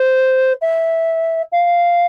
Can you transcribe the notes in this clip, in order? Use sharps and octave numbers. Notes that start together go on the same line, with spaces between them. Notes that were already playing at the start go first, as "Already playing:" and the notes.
Already playing: C5
E5
F5